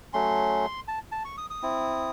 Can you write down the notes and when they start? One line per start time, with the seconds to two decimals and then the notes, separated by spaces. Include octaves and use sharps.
0.13 F#3 A3 C#4 C6
0.88 A5
1.12 A5
1.25 C#6
1.38 D#6
1.50 D#6
1.62 C4 E4